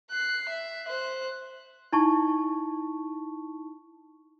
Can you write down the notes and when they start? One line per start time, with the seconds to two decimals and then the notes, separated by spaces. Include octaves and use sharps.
0.11 F#6 C7
0.49 E5
0.85 C5 F#6
1.93 D#4 E4 A5 C#6